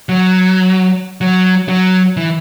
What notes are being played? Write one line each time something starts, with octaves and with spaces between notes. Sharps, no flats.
F#3
F#3
F#3
E3